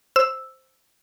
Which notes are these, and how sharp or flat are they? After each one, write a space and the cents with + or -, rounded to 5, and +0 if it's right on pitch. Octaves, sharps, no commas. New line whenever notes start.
C5 +0 E6 +0